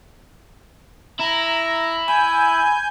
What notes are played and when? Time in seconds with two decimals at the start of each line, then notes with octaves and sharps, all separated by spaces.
1.20 E4 A#5
2.08 G#5 B5 G6